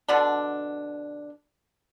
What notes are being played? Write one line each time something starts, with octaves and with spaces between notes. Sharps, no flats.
B2 D3 D4